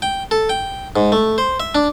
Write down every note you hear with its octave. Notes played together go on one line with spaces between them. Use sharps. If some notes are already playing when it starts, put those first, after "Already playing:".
G5
A4
G5
G#2
A3
C5
E5
D4